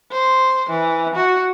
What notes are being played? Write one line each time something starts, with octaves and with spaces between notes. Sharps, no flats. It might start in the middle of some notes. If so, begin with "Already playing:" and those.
C5
E3
F#4